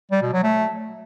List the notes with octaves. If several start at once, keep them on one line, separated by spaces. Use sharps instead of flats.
G3
B2
F#3
A3